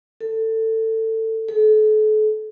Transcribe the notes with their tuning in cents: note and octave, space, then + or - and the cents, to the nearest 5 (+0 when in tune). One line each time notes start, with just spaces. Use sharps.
A4 +20
A4 -40